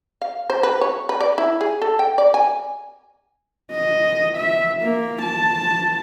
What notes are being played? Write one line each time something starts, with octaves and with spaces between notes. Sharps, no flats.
F5
C5
B4
C#5
B4
D5
E4
G#4
A4
G5
D5
G#5
D#5
E5
A#3
A5